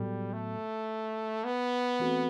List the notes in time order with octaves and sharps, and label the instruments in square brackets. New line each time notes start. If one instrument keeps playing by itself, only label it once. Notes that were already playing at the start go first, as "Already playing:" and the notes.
Already playing: [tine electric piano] A2 F#3 B3 F#4 A4 [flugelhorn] G3
[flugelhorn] A3
B3
[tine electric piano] E3 A3 C4 F#4 A4